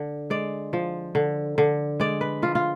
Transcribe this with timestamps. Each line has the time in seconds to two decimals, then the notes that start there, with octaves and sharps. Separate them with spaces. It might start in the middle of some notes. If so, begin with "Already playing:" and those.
Already playing: D3
0.30 G#3 D5
0.73 F3
1.15 D3
1.58 D3
2.00 G#3 D5
2.21 B4
2.42 F3 F4
2.55 F4